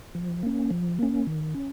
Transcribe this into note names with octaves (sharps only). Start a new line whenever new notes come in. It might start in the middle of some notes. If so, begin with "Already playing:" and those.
F3
A#3 C#4
F3
A#3 C#4
D#3
C#4